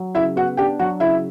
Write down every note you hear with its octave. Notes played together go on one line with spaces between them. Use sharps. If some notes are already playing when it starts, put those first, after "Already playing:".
Already playing: F#3
C#3 E4 E5
B3 F#4 F#5
D4 G4 G5
F#3 F#4 F#5
C#3 E4 E5